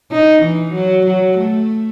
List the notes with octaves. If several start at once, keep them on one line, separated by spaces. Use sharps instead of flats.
D#4
E3
F#3
F#3
A3